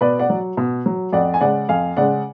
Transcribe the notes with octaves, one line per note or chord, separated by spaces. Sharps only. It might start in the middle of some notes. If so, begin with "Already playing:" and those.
B2 B4 D5
D5 F#5
F#3
B2
F#3
F2 D5 F#5
G#5
C#3 G#3 D5 F#5
F2 F5 G#5
C#3 G#3 D5 F#5